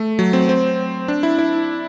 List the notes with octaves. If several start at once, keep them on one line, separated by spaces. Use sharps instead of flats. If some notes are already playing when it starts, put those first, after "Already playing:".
Already playing: A3
F#3
C4
C4
D4
E4
E4